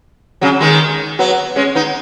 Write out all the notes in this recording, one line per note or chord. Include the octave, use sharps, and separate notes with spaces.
C#3 F#3
D#3 G#3
F#3 B3
G#3 C#4
B3 D#4